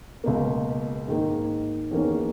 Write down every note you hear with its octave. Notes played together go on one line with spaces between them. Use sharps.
C#2 B2 A#3
G#2 D#3 A#3
E2 D#3 A#3 C#4